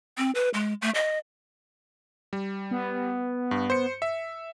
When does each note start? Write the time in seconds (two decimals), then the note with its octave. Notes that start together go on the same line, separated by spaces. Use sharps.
0.18 C4
0.35 B4
0.54 G#3
0.82 A3
0.95 D#5
2.33 G3
2.71 B3
3.51 G2
3.70 C5 C#7
4.02 E5